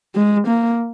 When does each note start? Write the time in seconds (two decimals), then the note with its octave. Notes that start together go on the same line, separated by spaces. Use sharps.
0.16 G#3
0.48 A#3